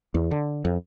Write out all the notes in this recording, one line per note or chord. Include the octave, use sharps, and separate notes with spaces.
E2
D3
F2